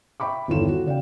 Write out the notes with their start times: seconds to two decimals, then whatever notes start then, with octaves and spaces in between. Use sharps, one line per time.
0.20 E5 G5 B5 C#6 D6
0.48 G1 E2 D#3 F4 A4 E7
0.68 F#4
0.86 C#3 D5 F5 G5